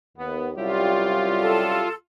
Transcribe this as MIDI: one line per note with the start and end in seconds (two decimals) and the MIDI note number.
0.17 0.54 39
0.17 0.48 59
0.57 1.88 36
0.57 1.88 54
0.57 1.88 55
0.57 1.85 61
0.57 1.85 64
0.57 1.89 65
0.57 1.85 67
1.38 1.93 69